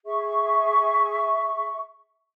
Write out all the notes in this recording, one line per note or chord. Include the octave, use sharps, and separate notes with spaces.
G#4 E5 C#6